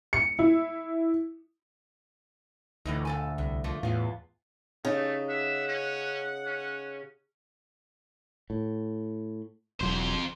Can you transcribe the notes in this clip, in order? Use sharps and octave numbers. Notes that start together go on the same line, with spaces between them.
C#7
E4
D2 A2 E3 D#4
A#2 A4 G#5
C2 A2
F3 A3 A#3
E2 A2 B3 F4
C#3 A3 D#4
E5 F#5
C#4
C#4
A2
E1 F2 F#3 C5